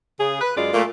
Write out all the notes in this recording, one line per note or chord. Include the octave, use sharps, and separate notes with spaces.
C#3 G#4
B4
F#2 G#3 F4 D5
A#2 A3